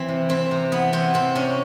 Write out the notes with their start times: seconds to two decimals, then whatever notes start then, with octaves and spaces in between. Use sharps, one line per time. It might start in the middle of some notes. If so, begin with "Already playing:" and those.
Already playing: E3 C4
0.08 C3
0.29 E3 C4
0.51 C3
0.72 E3 B3
0.93 C3 C4
1.14 C3 C4
1.35 C3 C#4